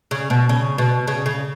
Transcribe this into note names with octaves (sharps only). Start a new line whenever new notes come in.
C#3
B2
C#3
B2
C#3
C#3